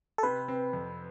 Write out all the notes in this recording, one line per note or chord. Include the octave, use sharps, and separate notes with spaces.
A4
C3 B4
C4
F2